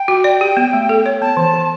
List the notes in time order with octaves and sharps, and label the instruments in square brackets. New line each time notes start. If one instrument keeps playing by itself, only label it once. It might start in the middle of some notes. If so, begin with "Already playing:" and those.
Already playing: [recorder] G5
[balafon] F#4
D5
G4
B3
A3
A4
C#5
[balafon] B3 [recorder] A5
[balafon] E3
E3